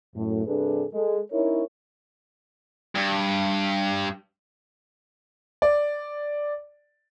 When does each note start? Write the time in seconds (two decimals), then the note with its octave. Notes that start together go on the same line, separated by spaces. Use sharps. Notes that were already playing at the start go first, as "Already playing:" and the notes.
0.15 F#2 A2
0.46 G2 C3 D4 G#4 A4 B4
0.93 G#3 A4
1.31 C#4 D#4 E4 A#4 C#5
2.96 G2
5.62 D5